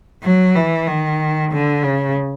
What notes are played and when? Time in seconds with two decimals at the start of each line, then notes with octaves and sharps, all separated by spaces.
0.23 F#3
0.55 E3
0.87 D#3
1.52 D3
1.83 C#3